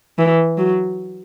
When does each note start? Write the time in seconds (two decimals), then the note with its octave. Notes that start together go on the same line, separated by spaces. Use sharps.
0.18 E3
0.58 F#3